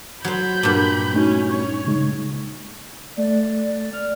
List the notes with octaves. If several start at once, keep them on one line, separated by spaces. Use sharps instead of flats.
F#3 C5 B5 G6
G2 A#2
A3 C#4 D#4 F#4
C#5
C#3 G#3 D#4
A3 D5
F6